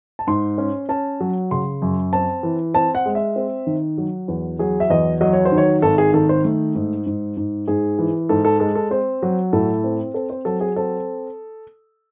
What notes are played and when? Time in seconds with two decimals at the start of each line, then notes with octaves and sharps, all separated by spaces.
0.19 A5
0.27 G#2 C6
0.58 C#4
0.89 C#4 A5
1.20 F#3
1.51 C#3 C6
1.82 F#2
2.13 C4 A5
2.43 E3
2.74 C4 A5
2.95 F#5
3.05 G#3
3.15 E5
3.36 C4
3.67 D#3
3.98 F#3
4.28 E2
4.59 F#3 G#4
4.80 E5
4.90 E2 D#5
5.21 F#3 D#5
5.33 C#5
5.45 C5
5.52 D#3
5.58 C#5
5.82 G#1 A4
5.98 G#4
6.13 D#3 A4
6.29 C5
6.45 A3
6.75 G#2
7.06 G#2
7.37 G#2
7.68 G#2 G#4
7.99 E3
8.29 G#2 A4
8.45 A4
8.60 G#3 A4
8.75 A4
8.91 C4 C5
9.22 F#3
9.53 A2 A4
9.84 C4
10.14 C4 A4
10.30 C5
10.45 F#3 A4
10.61 G#4
10.76 C4 A4